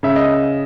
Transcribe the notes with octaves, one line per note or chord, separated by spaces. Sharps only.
C#3 E5
D#5